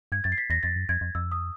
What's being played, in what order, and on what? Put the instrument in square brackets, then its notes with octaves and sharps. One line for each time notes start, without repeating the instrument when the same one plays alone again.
[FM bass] G2 [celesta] G#6
[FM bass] F#2 [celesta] A6
[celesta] C7
B6
[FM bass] E2 [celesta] A#6
[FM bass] F2 [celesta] A6
[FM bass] F#2
[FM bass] F2 [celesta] G#6
[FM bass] F2
[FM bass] F2 [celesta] E6
[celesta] D#6